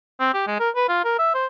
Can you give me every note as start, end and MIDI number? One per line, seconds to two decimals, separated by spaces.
0.20 0.32 60
0.34 0.43 67
0.47 0.55 56
0.60 0.70 70
0.76 0.86 71
0.89 1.02 65
1.05 1.19 70
1.19 1.33 76
1.34 1.46 72